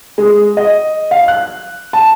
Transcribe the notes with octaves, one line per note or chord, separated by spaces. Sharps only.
G#3
D#5
F5
F#6
A5